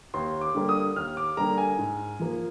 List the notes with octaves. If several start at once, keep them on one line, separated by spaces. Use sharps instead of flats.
D#2 C6
D6
D3 G3 A#3
D#6
D#2 F6
D6
D3 G3 A#3 A#5
G#5
G#2
F3 A#3